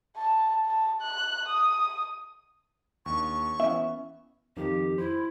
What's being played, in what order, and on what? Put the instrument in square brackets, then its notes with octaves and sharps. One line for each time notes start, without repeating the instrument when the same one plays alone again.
[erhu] A5
A5
F#6
D#6
[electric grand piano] D#2 D4 [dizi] C#6
[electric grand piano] E3 B3 C#4 [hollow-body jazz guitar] E5
[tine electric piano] F2 D#3 [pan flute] G4
[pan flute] E4 [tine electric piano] C5